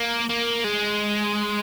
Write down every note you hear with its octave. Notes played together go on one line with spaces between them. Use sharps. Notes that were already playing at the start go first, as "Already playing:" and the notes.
Already playing: A#3
A#3
G#3